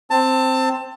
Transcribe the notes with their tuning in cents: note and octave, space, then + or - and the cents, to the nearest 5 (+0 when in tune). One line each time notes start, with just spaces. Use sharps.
C4 +0 A5 +25